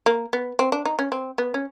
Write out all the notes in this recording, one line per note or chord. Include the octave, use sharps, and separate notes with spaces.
A#3
B3
C4
D4
D#4
C#4
C4
B3
C#4